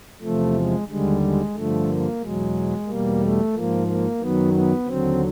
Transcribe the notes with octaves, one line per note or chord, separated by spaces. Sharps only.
E2 C3 F3 A3
G#3
D#2 D3 G3 G#3
G#3
G2 D3 F3 A3
A#3
E2 B2 F#3 G#3
E2 B2 G3 A#3
A3
G#2 F3 A#3
A#3
F#2 D#3 F#3 B3
B3
D#2 D3 F#3 C4